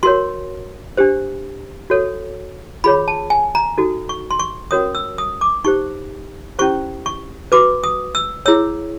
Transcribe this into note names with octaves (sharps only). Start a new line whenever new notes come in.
F#4 A#4 C#5 C6
D4 G4 C5
F#4 A4 C#5
F4 G#4 C#5 B5
A5
G#5
A#5
D#4 F#4 A4
C#6
C6
C#6
C#4 F#4 A#4 C#5 D#6
E6
D#6
D6
D#4 G4 C5 C#6
C#4 E4 G4 C5 C#6
C#6
F#4 B4 D6
D#6
E6
E4 G#4 C#5 E6